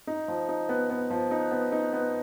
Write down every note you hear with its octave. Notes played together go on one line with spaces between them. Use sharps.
D#4
F3
D#4
B3
B3
F3
D#4
B3
D#4
B3